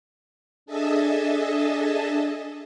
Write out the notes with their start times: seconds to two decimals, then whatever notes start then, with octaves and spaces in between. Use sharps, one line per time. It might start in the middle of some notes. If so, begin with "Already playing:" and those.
0.66 D4 G#4 A4 D#5 E5 A5